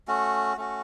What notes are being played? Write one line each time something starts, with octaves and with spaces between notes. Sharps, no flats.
A3 C#4 F#4
A3 C#4 F#4